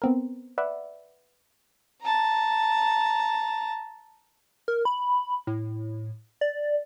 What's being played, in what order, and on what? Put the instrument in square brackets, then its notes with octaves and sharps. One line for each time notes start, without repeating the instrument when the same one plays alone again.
[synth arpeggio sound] B3 C4 A#4
B4 D5 E5 F#5
[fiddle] A5 A#5
[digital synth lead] A#4
B5
A2
D5